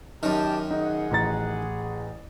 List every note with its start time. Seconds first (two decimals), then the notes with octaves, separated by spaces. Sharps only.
0.23 F#2 D#3 G4 A5
0.71 D#4 G#4 F#5
1.11 A1 A#5 A6